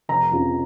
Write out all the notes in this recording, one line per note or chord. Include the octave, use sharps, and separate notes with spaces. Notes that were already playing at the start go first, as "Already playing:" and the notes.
F1 A#5
F2 C#3 F3